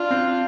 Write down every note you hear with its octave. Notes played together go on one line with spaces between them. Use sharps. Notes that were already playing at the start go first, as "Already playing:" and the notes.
Already playing: D4 F4
C4